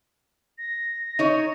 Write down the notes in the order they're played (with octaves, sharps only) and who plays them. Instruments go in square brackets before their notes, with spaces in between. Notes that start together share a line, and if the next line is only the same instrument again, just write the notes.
[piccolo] A#6
[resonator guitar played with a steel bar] D#4 C#5